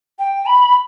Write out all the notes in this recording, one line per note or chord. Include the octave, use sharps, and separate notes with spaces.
G5
B5